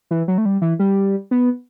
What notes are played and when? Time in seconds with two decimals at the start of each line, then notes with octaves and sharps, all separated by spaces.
0.11 E3
0.28 F#3
0.38 A3
0.45 G3
0.62 E3
0.79 G3
1.31 B3